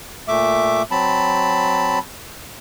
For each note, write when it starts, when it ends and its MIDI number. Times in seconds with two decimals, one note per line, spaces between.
0.28 0.82 46
0.28 0.82 57
0.28 0.82 76
0.28 0.82 86
0.91 1.99 54
0.91 1.99 60
0.91 1.99 81
0.91 1.99 83